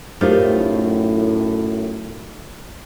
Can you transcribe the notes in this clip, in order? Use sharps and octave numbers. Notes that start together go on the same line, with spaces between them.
F#2 A2 A3 D#4 F4 G4 A#4 C5